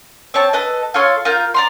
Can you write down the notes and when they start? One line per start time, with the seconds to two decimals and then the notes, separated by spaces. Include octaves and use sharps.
0.34 C4 C#5 A5
0.53 A4 B4 D#5
0.94 F4 A4 C#5 C6
1.25 F4 A#4 G6
1.54 D5 A#5 C6